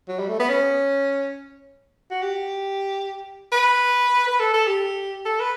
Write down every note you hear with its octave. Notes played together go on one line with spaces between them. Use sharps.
F#3
G3
A3
B3
C#4
F#4
G4
B4
B4
A4
A4
G4
A4
B4